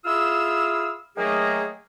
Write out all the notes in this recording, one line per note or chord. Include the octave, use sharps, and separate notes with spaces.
E4 F4 G#4 F5 E6
D#3 F#3 A3 A#3 D#4 G#4